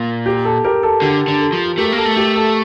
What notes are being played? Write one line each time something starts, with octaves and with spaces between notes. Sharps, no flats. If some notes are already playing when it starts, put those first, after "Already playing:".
Already playing: A#2
G4
A4
G4 A#4
A4
D3 G4
D3
A4
F3
A3 G4 A#4
A#3
A4
A3
G4
A4